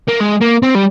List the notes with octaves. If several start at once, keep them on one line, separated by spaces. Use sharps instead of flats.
A#3
G#3
A#3
C4
G3